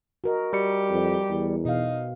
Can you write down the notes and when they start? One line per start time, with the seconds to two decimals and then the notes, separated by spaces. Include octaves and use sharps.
0.24 F#4 A#4 D#5
0.53 G3 G4 C#7
0.90 F2
1.29 E2
1.65 B2 D#4 F5